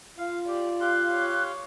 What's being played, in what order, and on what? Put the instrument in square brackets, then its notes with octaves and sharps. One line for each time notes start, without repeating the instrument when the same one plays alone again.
[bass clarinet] F4 [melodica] F5
[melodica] G4 [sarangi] D5
[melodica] G4 F5 C6 [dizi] F#6
[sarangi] C#5